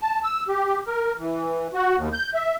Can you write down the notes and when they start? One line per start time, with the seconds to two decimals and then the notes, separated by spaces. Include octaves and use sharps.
0.01 A5
0.24 E6
0.48 G4
0.87 A#4
1.18 E3
1.74 F#4
1.96 D#2
2.13 G6
2.34 E5